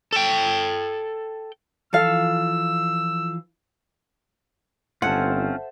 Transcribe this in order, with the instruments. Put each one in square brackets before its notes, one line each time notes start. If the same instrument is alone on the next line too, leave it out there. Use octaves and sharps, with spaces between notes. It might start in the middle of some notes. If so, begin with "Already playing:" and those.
[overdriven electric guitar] A4 G5
[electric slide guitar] E3 F3 F4 [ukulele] A4 F5 [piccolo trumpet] E6
[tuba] G1 [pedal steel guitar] C4 C#4 F4 [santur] A4 C5 E5 [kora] F#5